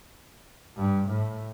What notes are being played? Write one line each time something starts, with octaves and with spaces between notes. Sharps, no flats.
G2
A2